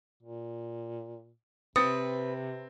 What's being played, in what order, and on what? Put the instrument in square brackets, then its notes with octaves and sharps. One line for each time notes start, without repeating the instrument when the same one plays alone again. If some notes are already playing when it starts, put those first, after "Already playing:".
[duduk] A#2
[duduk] C3 [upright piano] C4 A6 C#7 [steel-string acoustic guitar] B4 [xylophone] D#6